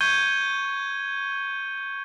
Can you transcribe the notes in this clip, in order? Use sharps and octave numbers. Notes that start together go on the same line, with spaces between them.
C#6 G6 G#6 C#7 D#7 G7